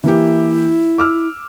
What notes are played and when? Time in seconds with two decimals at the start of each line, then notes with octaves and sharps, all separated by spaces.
0.04 E3 A#3 E4 G4
0.98 D6 E6 F6